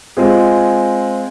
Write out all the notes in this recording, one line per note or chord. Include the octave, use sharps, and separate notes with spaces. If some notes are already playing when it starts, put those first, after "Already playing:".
G#3 C4 F4 G#4